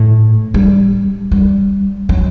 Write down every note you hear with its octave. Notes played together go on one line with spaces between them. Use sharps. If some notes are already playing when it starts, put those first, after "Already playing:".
Already playing: A2
G3
G3
F#3